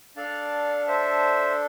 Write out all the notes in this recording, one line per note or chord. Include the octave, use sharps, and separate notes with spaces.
D4 A4 D5 F5
C5 E5